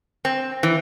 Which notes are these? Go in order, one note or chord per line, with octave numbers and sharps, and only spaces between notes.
C4
E3